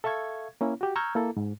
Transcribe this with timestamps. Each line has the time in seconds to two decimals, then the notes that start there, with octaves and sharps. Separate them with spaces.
0.04 A4 E5 F5 C#6 G#6
0.61 A#3 C#4 E4
0.81 F#4 G4
0.96 A#5 C#6 E6 F6 G6 G#6
1.15 A#3 E4 A4
1.37 G#2